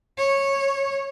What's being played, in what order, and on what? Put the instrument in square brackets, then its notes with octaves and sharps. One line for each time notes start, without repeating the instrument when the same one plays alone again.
[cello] C#5